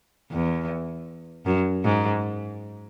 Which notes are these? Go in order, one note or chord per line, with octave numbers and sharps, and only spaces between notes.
E2
F#2
G#2